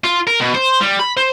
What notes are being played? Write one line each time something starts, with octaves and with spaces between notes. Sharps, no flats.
F4
A#4
B2
C5
G3
B5
C5